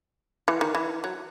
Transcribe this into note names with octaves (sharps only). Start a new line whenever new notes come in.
E3
D#3
E3
F#3